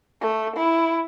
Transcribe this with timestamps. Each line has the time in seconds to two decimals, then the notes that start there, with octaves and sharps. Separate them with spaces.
0.21 A3
0.57 E4